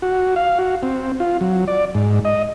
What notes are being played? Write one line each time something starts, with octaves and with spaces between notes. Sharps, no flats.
F#4
F5
F#4
C4
F4
F#3
D5
G#2
D#5